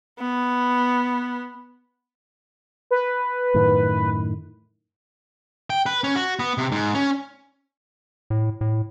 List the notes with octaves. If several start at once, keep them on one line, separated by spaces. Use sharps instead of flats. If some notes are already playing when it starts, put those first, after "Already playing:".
B3
B4
F#2 A2 D#3
G5
B4
C#4
F#4
B3
C3
G#2
C#4
A2
A2